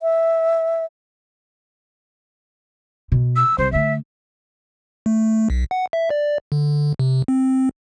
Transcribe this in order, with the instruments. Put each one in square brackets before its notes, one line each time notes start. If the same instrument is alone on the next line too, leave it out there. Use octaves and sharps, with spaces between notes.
[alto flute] E5
[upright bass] B2
[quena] E6
[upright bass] C2 [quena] C5
[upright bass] D3 A3 [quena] E5
[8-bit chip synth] A3
B1
F#5
E5
D5
D3
C3
C4